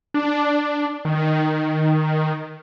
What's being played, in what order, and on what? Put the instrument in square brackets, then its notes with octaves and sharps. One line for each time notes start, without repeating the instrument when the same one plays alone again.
[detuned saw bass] D4
D#3